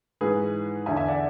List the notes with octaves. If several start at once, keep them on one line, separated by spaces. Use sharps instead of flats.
G#2 E3 G#4 B4
E2 D3 E5 G#5
E5 G#5
D5 F#5